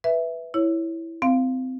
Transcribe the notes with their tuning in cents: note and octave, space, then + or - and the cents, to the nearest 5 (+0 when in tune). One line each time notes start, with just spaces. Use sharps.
B4 +0 E5 +0
E4 +0 C#5 +0
C4 -25 F5 +0